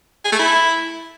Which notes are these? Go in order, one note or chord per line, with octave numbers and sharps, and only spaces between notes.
G#4
A3
E4